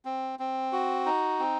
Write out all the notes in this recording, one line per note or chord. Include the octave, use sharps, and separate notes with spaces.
C4
C4
F#4
D#4
C4